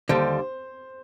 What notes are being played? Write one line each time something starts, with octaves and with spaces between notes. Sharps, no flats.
D#2 D3 G3 C5